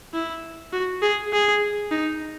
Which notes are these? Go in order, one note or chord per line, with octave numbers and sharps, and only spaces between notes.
E4
F#4
G#4
G#4
D#4